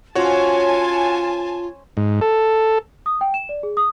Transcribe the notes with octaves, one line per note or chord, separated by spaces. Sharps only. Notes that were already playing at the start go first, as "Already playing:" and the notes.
C#4 F4 F#4 C5 C#5 G#5 A5
G#2
A4
D#6
G5
E7
D5
G#4
D#6